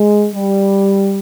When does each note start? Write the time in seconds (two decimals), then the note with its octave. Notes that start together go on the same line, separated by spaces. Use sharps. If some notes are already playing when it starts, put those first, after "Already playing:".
Already playing: G#3
0.33 G3